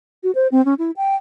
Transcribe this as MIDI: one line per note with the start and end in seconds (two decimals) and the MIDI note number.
0.23 0.31 66
0.35 0.48 72
0.52 0.64 60
0.65 0.74 61
0.79 0.91 64
0.97 1.16 79